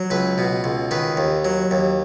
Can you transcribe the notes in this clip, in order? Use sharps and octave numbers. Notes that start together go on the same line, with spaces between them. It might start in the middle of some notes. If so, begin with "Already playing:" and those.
Already playing: F#3
C#2 B4
B2
C#2
D#3 B4
D#2
F#3
D#2